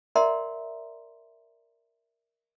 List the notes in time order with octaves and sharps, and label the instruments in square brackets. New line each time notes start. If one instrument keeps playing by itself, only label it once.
[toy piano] A#4 D5 E5 F#5 A#5 C6